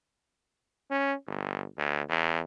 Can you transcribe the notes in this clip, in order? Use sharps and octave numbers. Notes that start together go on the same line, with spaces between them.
C#4
G1
D2
E2